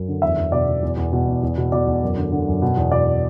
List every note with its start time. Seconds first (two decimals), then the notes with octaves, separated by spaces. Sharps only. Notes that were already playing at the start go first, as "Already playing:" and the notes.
Already playing: F#2
0.08 D3
0.22 E2 E5
0.37 E2
0.52 B2 D5
0.68 B2
0.83 E2
0.97 E2
1.12 B2
1.27 E2
1.43 E2
1.58 B2
1.72 B2 D5
1.87 E2
2.02 F#2
2.17 D3
2.32 D3
2.48 F#2
2.62 B2
2.77 E2
2.91 B2 D5